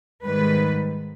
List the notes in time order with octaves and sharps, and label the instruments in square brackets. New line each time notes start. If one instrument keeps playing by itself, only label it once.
[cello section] G#2 D#3 G3 B4